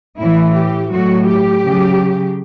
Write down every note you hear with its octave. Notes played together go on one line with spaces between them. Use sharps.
A2 E3 E4
G4
A2 F#3 F#4
G4
C#3 F#3